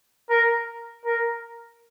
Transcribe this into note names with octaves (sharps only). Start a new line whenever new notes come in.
A#4
A#4